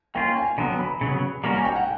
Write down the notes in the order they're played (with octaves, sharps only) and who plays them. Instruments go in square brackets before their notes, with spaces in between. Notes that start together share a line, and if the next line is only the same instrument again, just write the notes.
[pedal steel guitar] A#3 C#4 F4 [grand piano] G5
[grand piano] G#5
[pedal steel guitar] D3 F#3 B3 [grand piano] A#5
[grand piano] B5
[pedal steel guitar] C#3 F#3 B3
[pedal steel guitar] G3 A#3 C#4 F#4 A#4 [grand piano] A#5
[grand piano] G#5
G5
F#5